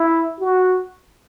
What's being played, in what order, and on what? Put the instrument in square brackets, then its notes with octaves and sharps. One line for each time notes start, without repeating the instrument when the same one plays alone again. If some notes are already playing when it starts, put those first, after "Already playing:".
Already playing: [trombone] E4
F#4